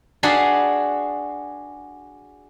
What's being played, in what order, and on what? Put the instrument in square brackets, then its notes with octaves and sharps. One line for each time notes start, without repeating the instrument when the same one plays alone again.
[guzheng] D4 F#4 G#4 F5 A5 B5